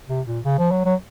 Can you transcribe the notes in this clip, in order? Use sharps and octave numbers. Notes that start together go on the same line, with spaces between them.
C3
A#2
C#3
F3
F#3
F#3